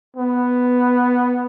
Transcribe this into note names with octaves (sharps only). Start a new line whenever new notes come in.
B3